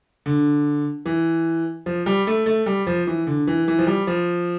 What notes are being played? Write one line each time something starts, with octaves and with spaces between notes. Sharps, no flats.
D3
E3
F3
G3
A3
A3
G3
F3
E3
D3
E3
E3
F3
G3
F3